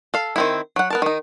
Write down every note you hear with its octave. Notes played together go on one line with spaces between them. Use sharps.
A4 F5
D#3 C4 E4
F#3 F#5
B3 A#4 A5
D#3 D#4